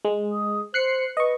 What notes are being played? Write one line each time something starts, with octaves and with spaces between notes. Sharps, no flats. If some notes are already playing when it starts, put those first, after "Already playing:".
G#3
D#6
C5 F#6 C7 C#7
B4 D#5 C#6